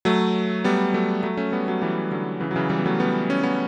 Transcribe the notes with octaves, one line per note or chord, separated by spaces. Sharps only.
F#3 A3
G3 B3
F#3 A3
F#3 A3
A3 C#4
G3 B3
F#3 A3
E3 G3
D3 F#3
C#3 E3
F#3
C#3 E3
E3 G3
B3
F#3 A3
G3 B3
C#4
B3